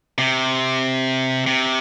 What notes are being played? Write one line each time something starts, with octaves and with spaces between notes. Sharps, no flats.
C3
C3